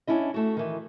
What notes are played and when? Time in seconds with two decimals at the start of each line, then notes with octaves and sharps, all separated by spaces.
0.07 C#4 D4 E4 D#5
0.34 A3 F#4
0.57 D#3 E3